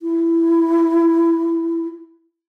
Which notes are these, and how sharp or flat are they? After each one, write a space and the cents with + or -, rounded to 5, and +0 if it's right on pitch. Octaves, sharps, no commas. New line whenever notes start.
E4 +10